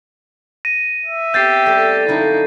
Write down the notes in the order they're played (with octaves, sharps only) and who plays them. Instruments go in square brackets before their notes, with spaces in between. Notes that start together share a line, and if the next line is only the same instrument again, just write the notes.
[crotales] A#6 D#7
[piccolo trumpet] E5
[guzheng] B3 C4 [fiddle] G4 [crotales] G6 A6 C7
[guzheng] G3 A3
[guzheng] F#2 D3 F3 [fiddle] D#4 E4